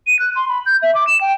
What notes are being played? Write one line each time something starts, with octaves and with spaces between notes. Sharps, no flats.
D#7
F#6
C6
B5
G6
E5
D6
E7
G5